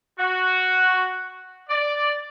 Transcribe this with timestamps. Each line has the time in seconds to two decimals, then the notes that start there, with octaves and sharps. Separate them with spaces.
0.19 F#4
1.70 D5